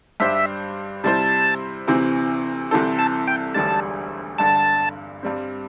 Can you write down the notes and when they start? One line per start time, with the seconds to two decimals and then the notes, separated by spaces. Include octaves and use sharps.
0.20 G2 G3 D4 G4 C5 E5
1.04 C3 G3 E4 C5 A5
1.87 D2 C3 E3 C4
2.71 C2 C3 E3 C4 A4
2.99 A5
3.28 G5
3.55 E1 D2 D3 G3 A5
4.38 G1 G2 D3 A5
5.23 G2 G3 C4